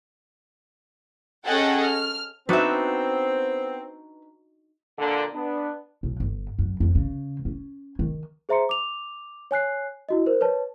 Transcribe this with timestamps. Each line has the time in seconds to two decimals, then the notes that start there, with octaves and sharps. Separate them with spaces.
1.46 C#4 G#4 A4 D#5 F#5 G5
1.81 F6
2.49 B3 C4 D4 D#4 F#4 B4 E5
4.98 A#2 D3
5.33 B3 D4
6.03 B1
6.20 G1
6.59 F#2
6.80 F2
6.95 C#3
7.45 C#4
7.99 D#3
8.49 G#4 C5 E5 A#5 C6 C#7
8.69 D6 F7
9.51 C#5 G#5 F#6 C7
10.09 E4 F#4 D#5
10.26 A#4 C5
10.41 B4 C#5 A5